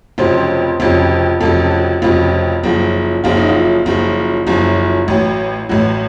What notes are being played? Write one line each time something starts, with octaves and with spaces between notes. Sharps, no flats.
F1 F2 C#3 F#3 C5
F1 F2 C#3 F#3
F1 F2 C#3 F#3 A4
F#4
F1 F2 C#3 F#3 F4
F#1 F#2 F3
F#1 F#2 F3 F4
D#4
F4
F#1 F#2 F3
F#1 F#2 F3
A1 A2 F#3
A1 A2 F#3 F#4